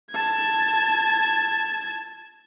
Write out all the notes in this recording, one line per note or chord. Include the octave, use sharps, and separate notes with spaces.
A5 G#6